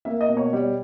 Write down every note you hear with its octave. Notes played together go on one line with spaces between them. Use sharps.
A#3 E5
D#5
B2
C#5
G3